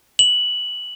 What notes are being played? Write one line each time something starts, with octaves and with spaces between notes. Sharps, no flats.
F#7